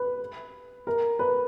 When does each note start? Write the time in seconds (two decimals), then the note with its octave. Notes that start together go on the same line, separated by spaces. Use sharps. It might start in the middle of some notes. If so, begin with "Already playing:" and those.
Already playing: B4
0.87 A#4
1.19 B4